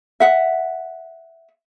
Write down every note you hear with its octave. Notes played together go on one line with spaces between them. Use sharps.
E5 F#5